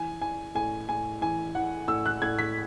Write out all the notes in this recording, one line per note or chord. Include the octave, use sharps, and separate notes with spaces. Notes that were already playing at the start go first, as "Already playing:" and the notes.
Already playing: E3 G#5
E3 G#5
A2 G#5
A2 G#5
E3 G#5
E3 F#5
A2 E6
F#6
A2 G#6
B6